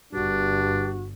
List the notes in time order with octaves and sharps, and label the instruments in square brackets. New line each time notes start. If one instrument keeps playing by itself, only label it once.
[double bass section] G1 [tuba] G2 [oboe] D4 [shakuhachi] F#4